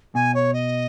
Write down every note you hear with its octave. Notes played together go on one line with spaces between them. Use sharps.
B2 G#5
C#5
D#5